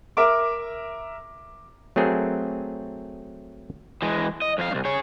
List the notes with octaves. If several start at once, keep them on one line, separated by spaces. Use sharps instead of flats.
A#4 E5 D6
F#3 A3 C4 G#4 A#4
E3 G#3
D#5
F2 F5
C2 G2
G#4 C#5